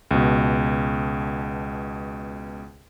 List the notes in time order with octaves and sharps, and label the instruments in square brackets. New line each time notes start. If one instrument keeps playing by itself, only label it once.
[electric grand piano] C#2 B2